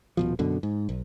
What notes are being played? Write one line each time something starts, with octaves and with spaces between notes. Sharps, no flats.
D#1 B2 F3
F#2 B2 D3
G#2
B1